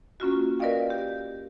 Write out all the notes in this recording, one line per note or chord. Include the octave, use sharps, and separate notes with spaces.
A#3 C#4 F4 F#4
A#4 B4 D5 D#5 F5 G5
G4